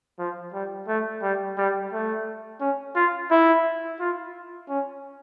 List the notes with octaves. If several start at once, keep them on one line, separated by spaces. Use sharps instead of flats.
F3
G3
A3
G3
G3
A3
C#4
F4
E4
F4
C#4